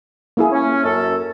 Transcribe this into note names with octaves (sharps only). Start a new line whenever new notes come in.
A#3 E4 G#4
C#4
F#2 A4